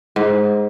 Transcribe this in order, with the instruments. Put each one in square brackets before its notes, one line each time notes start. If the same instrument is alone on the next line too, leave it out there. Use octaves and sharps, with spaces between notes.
[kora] G#2